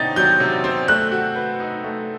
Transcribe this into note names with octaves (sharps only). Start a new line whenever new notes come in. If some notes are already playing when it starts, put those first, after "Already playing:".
Already playing: C3 C4 D#4 A6
F#3 G6
C3
C4
A3 F#6
F#4
B4
D#4
A3